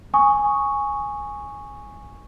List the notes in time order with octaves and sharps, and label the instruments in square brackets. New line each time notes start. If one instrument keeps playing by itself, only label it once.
[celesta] G#5 C#6 D#6